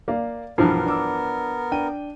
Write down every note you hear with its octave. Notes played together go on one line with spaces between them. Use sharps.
A#3 D5 F5
B1 G2 E3 F3 B3 A#4
D4 D6 E6
D4 G5 D#7